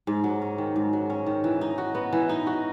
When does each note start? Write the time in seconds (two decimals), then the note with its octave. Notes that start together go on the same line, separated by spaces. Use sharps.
0.07 G#2
0.24 F#3
0.42 C#4
0.58 D#3
0.76 G#2
0.93 F#3
1.10 C#4
1.26 D#3
1.44 E3
1.61 D#4
1.78 F#4
1.95 B3
2.13 E3
2.29 D#4
2.47 F#4